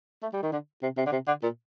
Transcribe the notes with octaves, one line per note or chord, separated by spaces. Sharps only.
A3
G3
D#3
D3
C3
C3
D3
C3
D3
A#2